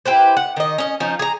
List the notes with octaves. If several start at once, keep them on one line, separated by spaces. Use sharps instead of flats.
E4 G4 B4 C5
F#5
D#3 D#5
C#4 D#5
F3 C#4 D#4
G#4 A#5